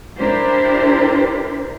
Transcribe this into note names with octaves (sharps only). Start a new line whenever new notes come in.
D4 E4 G4 A#4 C5